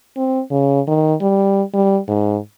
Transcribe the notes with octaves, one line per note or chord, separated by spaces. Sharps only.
C4
C#3
D#3
G3
G3
G#2